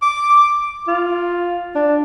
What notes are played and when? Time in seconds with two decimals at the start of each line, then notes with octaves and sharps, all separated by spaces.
0.02 D6
0.88 F4
1.75 D4